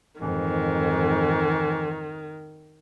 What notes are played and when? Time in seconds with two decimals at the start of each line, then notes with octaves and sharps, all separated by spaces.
0.20 F2 G#2 D#3 E3